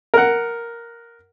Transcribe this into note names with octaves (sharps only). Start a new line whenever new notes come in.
A#4 F#5